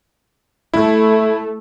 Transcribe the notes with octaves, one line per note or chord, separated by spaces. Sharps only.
A3 E4